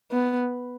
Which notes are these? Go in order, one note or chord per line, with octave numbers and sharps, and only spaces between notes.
B3